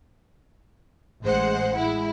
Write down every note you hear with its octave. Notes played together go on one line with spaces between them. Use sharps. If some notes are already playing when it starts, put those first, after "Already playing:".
A1 G#3 C5 F#5
G#3 E4